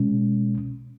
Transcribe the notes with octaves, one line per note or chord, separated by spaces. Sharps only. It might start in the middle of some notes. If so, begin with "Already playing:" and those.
Already playing: B2 G#3 C#4